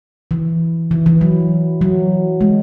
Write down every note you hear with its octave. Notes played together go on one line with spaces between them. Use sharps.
E3
E3
E3
F#3
F#3
G#3